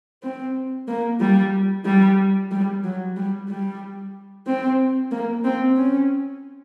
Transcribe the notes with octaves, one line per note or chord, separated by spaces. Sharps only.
C4
A#3
G3
G3
G3
F#3
G3
G3
C4
A#3
C4
C#4